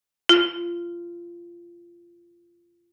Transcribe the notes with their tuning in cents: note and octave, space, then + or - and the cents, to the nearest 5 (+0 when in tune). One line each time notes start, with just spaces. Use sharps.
F4 -20